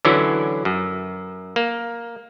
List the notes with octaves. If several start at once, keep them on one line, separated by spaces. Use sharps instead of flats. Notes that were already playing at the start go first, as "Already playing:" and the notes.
D3 E3 F#3 C#4 E4
F#2
A#3